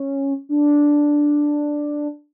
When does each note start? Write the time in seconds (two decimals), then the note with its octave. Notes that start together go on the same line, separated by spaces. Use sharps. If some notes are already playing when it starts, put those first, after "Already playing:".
Already playing: C#4
0.49 D4